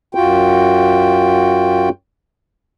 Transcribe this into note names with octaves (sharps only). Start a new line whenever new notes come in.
F#2 F4 F#4 G5